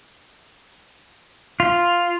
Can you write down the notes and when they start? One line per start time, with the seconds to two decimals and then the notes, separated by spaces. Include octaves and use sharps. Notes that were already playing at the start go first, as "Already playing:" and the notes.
1.60 F4